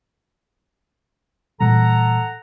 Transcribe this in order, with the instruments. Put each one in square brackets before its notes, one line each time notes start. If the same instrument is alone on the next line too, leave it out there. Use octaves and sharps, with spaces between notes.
[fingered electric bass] A#2 E3 G3 [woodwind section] A4 F#5 A#5